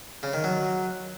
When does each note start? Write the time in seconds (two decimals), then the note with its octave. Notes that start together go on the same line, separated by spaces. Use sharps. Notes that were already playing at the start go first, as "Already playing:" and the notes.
0.23 C#3
0.34 D#3
0.44 F#3